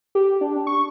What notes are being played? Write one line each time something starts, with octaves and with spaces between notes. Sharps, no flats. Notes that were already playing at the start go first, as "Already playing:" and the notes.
G4
D4
C#6